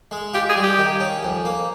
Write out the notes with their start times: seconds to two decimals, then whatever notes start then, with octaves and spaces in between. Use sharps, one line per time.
0.11 G#3
0.34 F4 G4
0.49 G#4
0.56 G3
0.63 G4
0.78 D#3
1.00 C#4
1.23 F2
1.45 A#3